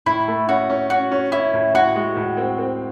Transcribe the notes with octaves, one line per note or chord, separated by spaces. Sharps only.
A2 E4
A3
C#4 F#4
C#4
C#4 F#4
C#4
C#4 E4
A2
A2 F#4
G#3
A2
C4
C4